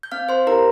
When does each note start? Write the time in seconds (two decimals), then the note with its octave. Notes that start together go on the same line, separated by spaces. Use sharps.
0.03 G6
0.12 C4 F5 F6
0.29 C5 C6
0.47 E4 G4 A#4 A#5